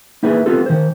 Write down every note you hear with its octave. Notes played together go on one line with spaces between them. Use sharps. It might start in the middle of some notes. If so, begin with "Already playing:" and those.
A#3 D#4 E4 G#4 B4
B3 C4 F4 G4 A4
D#3 C5